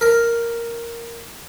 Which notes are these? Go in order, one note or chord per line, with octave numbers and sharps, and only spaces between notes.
A#4